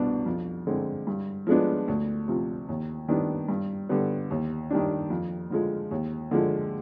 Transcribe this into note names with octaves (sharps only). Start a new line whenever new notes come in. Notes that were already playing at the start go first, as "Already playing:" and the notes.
Already playing: C2 B2 B3 D4
F2
D3 G#3 C4
G2
F3 G#3 B3 D4
D2
C3 F3
D#2
D#3 G3 B3 D4
G2
D3 G3 B3
D#2
D#3 G3 D4
F2
D3 F3 G#3
D#2
D3 F3 G#3